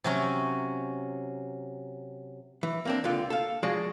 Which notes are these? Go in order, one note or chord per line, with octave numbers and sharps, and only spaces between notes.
C3 F#3 C#4
E3
A#3 C4 D4
C#2 D3 F4
A4 F5
F3 G#3 F#4 G#4 D5